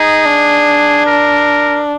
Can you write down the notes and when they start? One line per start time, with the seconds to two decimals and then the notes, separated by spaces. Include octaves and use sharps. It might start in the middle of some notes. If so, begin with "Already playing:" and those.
Already playing: D#4 G#4
0.25 D4
1.06 A#4